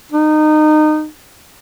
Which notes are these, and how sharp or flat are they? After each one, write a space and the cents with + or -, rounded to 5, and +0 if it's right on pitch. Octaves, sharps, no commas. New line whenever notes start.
D#4 -25